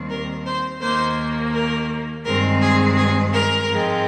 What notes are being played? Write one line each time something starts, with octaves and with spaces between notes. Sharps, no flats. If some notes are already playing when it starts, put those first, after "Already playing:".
Already playing: D#2 D#3 G3 C4
A#4
C5
D#2 D#3 A#3 C5
A#4
G2 D#3 G#3 C4 A#4
G#4
G#4
A#4
G#2 F3 G#3 C4